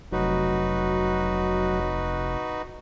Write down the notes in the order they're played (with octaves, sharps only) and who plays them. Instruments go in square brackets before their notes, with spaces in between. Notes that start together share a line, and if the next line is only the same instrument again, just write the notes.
[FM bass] F1 [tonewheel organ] F#3 [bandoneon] D#4 F#4 B4